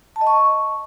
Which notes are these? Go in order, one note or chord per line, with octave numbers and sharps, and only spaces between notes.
A5
D#5
C#6